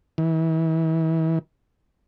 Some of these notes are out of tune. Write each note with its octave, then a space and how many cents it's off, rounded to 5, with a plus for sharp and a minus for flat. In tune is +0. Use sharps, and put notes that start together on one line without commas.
E3 -35